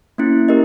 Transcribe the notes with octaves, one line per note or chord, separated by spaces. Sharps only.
A#3 C#4 E4
G4 A#4 D#5